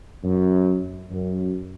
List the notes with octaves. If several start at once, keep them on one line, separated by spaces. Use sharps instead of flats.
F#2
F#2